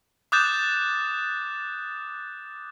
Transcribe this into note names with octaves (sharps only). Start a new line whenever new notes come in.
D6 D#6 F#6 G6 A6 E7